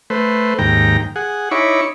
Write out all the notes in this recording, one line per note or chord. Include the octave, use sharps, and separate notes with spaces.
A3 B4 C5
D#2 G#2 G5 A#5
G#4 F#5
D#4 E4 C#5 B5 C#6 D6